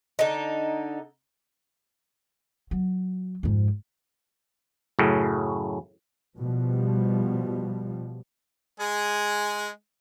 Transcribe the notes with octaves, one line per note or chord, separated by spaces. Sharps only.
D3 D#4
F#3
F2 G#2
F#2 A2 C#3
B2 F3 G3
G#3 G#4